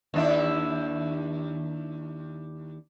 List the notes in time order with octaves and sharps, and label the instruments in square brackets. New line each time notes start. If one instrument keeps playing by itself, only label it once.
[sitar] D#2 D4 E4